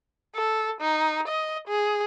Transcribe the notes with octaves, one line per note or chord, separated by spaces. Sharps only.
A4
D#4
D#5
G#4